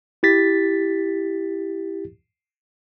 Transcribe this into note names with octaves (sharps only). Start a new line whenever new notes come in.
E4 G4 A6 B6